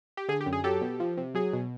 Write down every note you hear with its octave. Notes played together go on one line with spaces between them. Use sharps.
G4
D3 G#4
G4
F#2
G#4
F#3 G4 A4
B2
F3
C3
F#3 G#4
B2